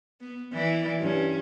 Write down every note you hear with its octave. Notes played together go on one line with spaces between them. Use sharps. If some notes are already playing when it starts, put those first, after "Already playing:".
B3
E3 D5
G2 C#4